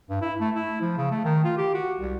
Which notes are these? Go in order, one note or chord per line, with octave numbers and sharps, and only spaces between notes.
G2
E4
A3
E4
F3
C#3
A3
D#3
F4
G4
F#4
C2